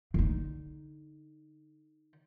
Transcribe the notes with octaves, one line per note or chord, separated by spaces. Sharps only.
D3 D#4